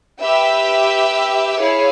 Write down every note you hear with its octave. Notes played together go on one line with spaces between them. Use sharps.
G4 B4 E5 G5
E4 G#4 C#5 F5